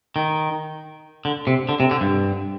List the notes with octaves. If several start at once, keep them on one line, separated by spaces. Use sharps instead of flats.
D#3
D3
C3
D3
C3
D3
G2